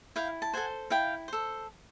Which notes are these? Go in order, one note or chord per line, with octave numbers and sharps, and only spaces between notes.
E4 F5 G5
A5
A4 C5 F#5 G#5
E4 F5 G5
A4 C5